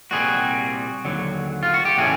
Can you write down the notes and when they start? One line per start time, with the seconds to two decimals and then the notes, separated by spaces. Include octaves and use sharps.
0.11 C2 A#2 G3 C4 F#4 G#4
1.05 D#2 D3 F#3
1.63 F4
1.74 F#4
1.85 G4
1.98 A2 E3 A3 C#4 F#4 G#4